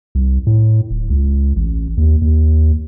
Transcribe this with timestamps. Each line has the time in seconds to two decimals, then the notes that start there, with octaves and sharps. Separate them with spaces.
0.15 C2
0.47 A2
0.91 D1
1.10 C#2
1.56 A1
1.97 D#2
2.22 D#2